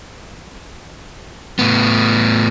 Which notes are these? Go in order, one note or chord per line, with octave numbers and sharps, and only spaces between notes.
A2 B3